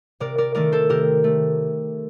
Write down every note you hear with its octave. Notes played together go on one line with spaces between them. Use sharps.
C3 A#4 D5
A#4 D5
D#3 A3 A#4 D5
A4 C5
C3 G4 A#4
A3